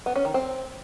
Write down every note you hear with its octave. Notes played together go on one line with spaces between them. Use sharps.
B3
C#4
D#3
C4